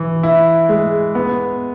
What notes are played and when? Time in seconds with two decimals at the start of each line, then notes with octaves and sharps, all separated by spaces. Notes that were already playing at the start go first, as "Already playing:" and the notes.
Already playing: E3
0.23 E4
0.69 G#3
1.15 B3